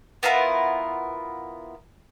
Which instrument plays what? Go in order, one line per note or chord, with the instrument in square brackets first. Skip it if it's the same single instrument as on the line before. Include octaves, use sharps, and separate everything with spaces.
[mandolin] B3 E4 F4 A#4